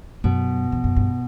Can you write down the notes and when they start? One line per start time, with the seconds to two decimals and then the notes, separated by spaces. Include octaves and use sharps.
0.24 F#2 B2
0.72 E2
0.84 F#2
0.97 G2